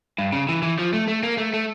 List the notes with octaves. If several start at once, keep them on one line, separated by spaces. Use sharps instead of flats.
G2
C#3
E3
E3
F3
A3
A3
A#3
A3
A3